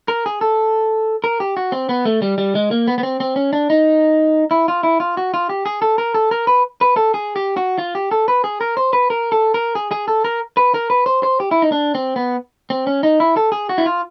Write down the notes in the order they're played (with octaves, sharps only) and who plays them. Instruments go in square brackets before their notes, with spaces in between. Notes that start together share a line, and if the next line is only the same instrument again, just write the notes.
[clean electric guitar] A#4
G#4
A4
A#4
G4
F#4
C4
B3
A3
G3
G3
G#3
A#3
B3
B3
C4
C4
C#4
D4
D#4
E4
F4
E4
F4
F#4
F4
G4
G#4
A4
A#4
A4
A#4
B4
B4
A4
G#4
G4
F#4
F4
G4
A4
B4
G#4
A#4
C5
B4
A#4
A4
A#4
G#4
G#4
A4
A#4
B4
A#4
B4
C5
C5
G4
E4
D#4
D4
C4
B3
C4
C#4
D#4
E4
A4
G#4
F#4
E4
F4